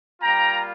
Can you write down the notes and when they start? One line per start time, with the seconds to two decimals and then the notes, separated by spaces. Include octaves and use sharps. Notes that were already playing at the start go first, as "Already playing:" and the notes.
0.21 G3 A#3 F4 G5 A#5